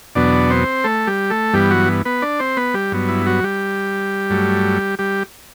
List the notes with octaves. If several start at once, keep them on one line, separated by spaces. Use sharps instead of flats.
E2 B2 F#3 B3 D4 D5
C4 C5
A3 A4
G3 G4
A3 A4
G2 E3 G3 B3 G4
F#3 F#4
B3 B4
D4 D5
C4 C5
B3 B4
G3 G4
G2 F#3 B3
E4
F#3 F#4
G3 G4
G2 F#3 A3
G3 G4